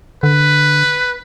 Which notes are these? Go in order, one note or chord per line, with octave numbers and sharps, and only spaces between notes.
D3 B4